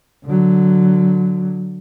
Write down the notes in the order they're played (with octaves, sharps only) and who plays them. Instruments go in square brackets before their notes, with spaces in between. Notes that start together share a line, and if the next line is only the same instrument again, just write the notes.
[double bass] D3 F#3